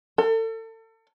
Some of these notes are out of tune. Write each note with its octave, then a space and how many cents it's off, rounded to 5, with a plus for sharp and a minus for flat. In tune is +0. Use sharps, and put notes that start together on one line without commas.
A4 +35